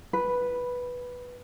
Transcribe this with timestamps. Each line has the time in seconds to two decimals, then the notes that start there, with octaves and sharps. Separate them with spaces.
0.13 B4